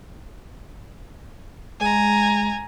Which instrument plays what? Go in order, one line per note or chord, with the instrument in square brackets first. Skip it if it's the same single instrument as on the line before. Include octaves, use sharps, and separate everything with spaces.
[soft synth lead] G#3 [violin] G#5 A#5